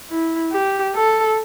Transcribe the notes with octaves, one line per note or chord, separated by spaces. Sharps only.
E4
G4
A4